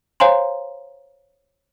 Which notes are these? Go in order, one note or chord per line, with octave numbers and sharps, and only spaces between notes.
C5 C#5 F5 G#5 A#5 C6